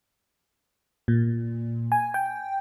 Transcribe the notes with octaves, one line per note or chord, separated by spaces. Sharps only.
A#2
G#5
G5